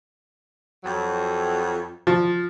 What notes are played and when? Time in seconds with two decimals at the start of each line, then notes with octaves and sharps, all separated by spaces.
0.84 F2 F#3
2.07 F3